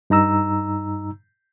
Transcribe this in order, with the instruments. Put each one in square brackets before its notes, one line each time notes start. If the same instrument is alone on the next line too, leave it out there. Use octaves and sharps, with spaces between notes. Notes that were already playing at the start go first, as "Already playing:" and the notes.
[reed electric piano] G2 D#4 A#5 E6